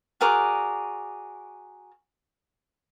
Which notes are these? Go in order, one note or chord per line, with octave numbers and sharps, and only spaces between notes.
F#4 G#4 A#4 D5